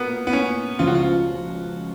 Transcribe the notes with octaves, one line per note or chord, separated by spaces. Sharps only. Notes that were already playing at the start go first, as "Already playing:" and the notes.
Already playing: A#2 A#3 B3 F#4
B3
C#4
C#2 C#3 F3 F4
F#4
F4